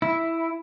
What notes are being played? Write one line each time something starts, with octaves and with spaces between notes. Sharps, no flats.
E4